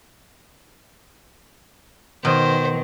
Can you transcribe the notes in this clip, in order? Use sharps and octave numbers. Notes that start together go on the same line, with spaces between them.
B2 D#3 C5